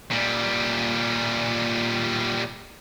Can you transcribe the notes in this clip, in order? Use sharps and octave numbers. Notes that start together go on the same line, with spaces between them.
A#2 G3